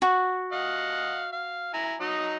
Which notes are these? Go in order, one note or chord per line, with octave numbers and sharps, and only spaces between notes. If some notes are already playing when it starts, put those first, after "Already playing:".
F#4
D#5 F5 F#5
F5
E4 G#5 A#5
F#3 D#4 D#5